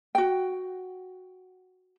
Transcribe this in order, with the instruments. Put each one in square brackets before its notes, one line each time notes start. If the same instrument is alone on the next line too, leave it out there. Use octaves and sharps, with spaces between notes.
[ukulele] F#4 G5